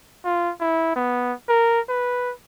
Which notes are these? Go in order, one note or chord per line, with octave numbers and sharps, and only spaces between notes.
F4
E4
B3
A#4
B4